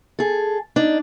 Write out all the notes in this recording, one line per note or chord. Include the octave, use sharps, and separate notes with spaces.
G#4 A4
D4 D#4